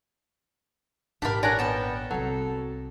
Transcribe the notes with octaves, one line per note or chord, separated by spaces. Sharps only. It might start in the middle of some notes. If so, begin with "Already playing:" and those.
G#1 A#2 D4 G4 A#4 B5
D4 A#4 C#5 D5 F#5 G#5
B3 G5 A5
C2 F#3 C4 A4